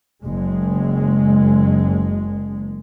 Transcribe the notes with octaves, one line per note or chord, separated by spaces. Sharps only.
F#1 G#3